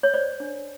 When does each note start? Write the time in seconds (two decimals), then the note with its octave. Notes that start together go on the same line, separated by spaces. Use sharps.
0.03 C#5
0.14 C5 D5
0.40 D4